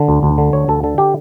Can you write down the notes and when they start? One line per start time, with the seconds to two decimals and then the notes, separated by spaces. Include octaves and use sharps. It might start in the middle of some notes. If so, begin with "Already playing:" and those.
Already playing: D3
0.08 D2
0.23 D2
0.38 D3
0.53 D2 C#5
0.68 D2 A4
0.83 D3 A4
0.98 G4